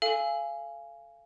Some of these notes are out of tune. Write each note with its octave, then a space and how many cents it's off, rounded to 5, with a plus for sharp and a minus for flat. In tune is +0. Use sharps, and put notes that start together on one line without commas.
A4 +0 F5 -25 G#5 +0